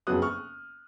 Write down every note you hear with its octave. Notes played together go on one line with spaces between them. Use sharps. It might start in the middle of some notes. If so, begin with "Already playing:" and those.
F#1 F2 C#3 F#3 B3 D#6 F#6
C#6 F6